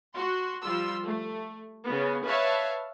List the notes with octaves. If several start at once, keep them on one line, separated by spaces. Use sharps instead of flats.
F#4 C6
F3 G3 F4 C6 E6
A3
C#3 B3
B4 C#5 E5 F5 A5